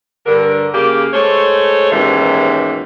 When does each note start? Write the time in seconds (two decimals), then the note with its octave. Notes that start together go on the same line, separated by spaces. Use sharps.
0.27 G2 D3 A#4
0.74 C#3 A#3 G4
1.14 G#3 A3 C5 C#5
1.92 D#2 G#2 B2 E3 C#4 G4